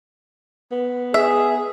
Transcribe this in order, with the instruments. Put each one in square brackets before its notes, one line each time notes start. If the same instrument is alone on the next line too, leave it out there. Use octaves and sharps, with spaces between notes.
[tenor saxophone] B3
[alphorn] G#4 [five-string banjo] E5